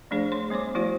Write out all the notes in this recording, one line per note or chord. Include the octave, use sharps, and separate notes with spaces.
F3 A3 D4 G#4 C5
C#5 C6
G3 B3 C5 C#5 D6
F3 A3 E4 F#4 C5